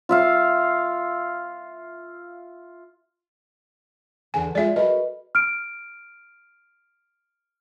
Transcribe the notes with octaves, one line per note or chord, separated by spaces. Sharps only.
F4 E5 F5
E2 D3 G#5
G#3 F4 D5 E5
F#4 A#4 B4 D#5
F6 D7